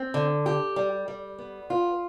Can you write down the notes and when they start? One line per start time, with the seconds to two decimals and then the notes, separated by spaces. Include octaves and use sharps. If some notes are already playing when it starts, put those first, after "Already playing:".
Already playing: C4
0.14 D3
0.46 G4
0.76 G3
1.08 G3
1.38 B3
1.70 F4